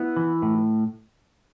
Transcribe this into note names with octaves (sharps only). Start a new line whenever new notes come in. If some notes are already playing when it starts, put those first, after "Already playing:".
Already playing: B3 E4
E3
A2